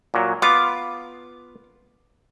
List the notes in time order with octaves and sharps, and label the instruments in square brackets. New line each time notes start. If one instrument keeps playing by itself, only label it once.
[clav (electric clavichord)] A#2 F#3
[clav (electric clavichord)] B3 F4 [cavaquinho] D6